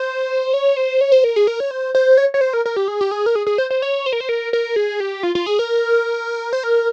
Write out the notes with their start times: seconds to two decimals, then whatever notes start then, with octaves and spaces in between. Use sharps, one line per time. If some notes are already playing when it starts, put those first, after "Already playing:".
Already playing: C5
0.54 C#5
0.77 C5
1.01 C#5
1.12 C5
1.24 A#4
1.36 G#4
1.47 A#4
1.60 C#5
1.71 C5
1.95 C5
2.17 C#5
2.34 C#5
2.41 C5
2.53 A#4
2.66 A#4
2.76 G4
2.88 G#4
3.01 G4
3.11 G#4
3.26 A#4
3.35 G#4
3.47 G#4
3.58 C5
3.70 C5
3.82 C#5
4.06 C5
4.13 A#4
4.20 C5
4.29 A#4
4.53 A#4
4.76 G#4
5.00 G4
5.23 F4
5.35 F4
5.46 G#4
5.59 A#4
6.53 C5
6.63 A#4